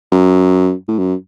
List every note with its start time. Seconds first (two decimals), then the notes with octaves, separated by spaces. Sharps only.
0.12 F#2
0.88 A2
0.99 F#2